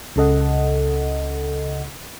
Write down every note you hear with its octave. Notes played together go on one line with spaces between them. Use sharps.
C#2 C#3 A4 D#5 F#5